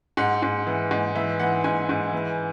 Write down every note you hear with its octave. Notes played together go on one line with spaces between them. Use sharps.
G#2 F#5
G#2
E3
G#2
E3 E5
E3 F#5
G#2 G#5
G#2
E3